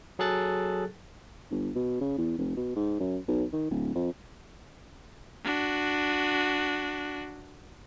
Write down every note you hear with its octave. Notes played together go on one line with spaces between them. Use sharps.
F#3 G#4 A4 F#6 A6
G1
B2
C#3
E2
F1
B2
G#2
F#2
B1
D#3
D1
F2
D4 F#4